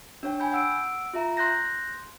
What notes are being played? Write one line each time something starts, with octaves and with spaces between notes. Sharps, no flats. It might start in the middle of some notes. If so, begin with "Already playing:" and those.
D4 C#5 G5
G#5 B5 G6
F#5 E6 D7
F4 E5 A#5
C6 F#6 G6 A#6